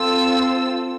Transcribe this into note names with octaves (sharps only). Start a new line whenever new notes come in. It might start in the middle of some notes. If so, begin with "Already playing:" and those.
Already playing: C4 F4 A4 E6